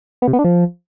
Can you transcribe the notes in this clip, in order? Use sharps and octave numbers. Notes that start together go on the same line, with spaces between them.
B3
C3
B3
D4
F3